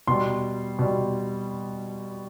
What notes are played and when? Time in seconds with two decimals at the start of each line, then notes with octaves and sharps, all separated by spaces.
0.07 B2 G3 C6
0.79 B2 G3